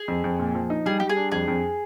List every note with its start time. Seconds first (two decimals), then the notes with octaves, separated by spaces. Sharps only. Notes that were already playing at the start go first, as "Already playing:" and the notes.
Already playing: G#4
0.08 F2
0.24 F2
0.39 A#2
0.55 F3
0.70 D#4
0.86 G3 G#4
1.00 G3 G4
1.09 G#4
1.16 D4
1.32 F2 G#4
1.48 F2